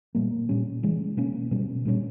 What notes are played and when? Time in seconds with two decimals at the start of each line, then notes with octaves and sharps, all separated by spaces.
0.15 A#2 G3 A#3
0.49 A#2 G3 C#4
0.83 C#3 E3 G#3
1.17 B2 A#3 C#4
1.51 B2 G3 C#4
1.85 A#2 G3 A#3 C#4